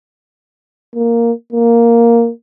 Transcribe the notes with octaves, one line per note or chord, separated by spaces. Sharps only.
A#3
A#3